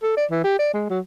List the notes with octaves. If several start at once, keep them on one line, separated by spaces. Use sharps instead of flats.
A4
D5
E3
G4
D5
G#3
F#3